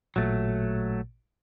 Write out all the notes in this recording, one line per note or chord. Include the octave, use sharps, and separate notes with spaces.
A1 A#2 F#3 A3 A6